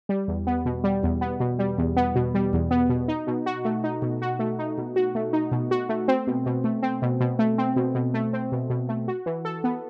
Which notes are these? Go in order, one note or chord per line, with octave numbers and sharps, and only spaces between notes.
G3
E2
B3
B2
G3
E2
B3
B2
G3
E2
B3
B2
G3
E2
B3
B2
D#4
B2
F#4
A3
D#4
B2
F#4
A3
D#4
B2
F#4
A3
D#4
B2
F#4
A3
C4
B2
B2
A3
C4
B2
B2
A3
C4
B2
B2
A3
C4
B2
B2
A3
F#4
E3
A4
B3